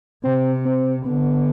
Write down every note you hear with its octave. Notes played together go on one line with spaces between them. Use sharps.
C3 C4
C4
D3 B3